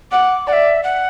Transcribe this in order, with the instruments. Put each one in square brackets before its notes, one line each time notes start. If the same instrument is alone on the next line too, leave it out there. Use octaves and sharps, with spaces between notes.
[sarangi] F#5 [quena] D6
[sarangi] D5 [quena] F#5
[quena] E5
F#5